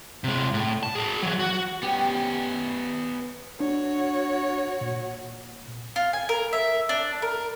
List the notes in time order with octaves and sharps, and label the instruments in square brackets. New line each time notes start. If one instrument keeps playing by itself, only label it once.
[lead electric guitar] C3 G#3
A2
A5
G#4 A#4
E3 F#3
F#4
[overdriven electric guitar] B3 C#4 [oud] G4
[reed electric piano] D4 [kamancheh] F#4 C#5
[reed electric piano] A#2
[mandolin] F4
G#5
A#4
E5
D4
A#4